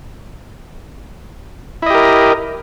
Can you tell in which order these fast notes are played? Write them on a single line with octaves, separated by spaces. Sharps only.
E4 D#5 G4 A#4